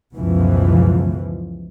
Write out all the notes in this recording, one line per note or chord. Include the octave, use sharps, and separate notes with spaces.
C#2 F#2 B2 E3 F3